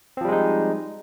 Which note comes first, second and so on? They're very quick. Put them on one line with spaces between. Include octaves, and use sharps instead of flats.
C4 F3 G3 G#3 D#4